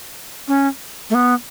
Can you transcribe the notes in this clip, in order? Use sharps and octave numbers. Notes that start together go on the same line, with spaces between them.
C#4
A3
B3